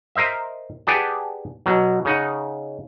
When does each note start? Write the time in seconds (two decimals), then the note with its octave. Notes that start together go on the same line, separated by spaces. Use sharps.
0.15 A#4 C5 D#5 E5
0.87 G4 G#4 B4 D5 F#5 A5
1.66 B2 F#3
2.05 C#3 D#4 F#5